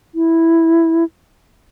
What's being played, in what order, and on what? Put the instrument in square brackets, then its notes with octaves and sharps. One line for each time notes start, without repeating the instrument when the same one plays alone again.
[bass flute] E4